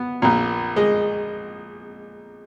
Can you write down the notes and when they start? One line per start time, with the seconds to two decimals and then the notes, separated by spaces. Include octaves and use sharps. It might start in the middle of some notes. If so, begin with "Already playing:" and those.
Already playing: B3
0.22 A#1 A#2
0.76 G#3